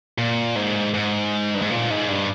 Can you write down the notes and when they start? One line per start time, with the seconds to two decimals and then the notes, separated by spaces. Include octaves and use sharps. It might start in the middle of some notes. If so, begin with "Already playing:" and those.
0.18 A#2
0.56 G#2
0.94 G#2
1.55 G2
1.62 G#2
1.70 A#2
1.90 G#2
2.08 G2